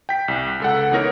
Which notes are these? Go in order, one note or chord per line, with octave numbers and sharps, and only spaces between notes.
G5 B6
C2
C#2 A4 F#5
E3 B3 D#4 A#4 C#5 A#6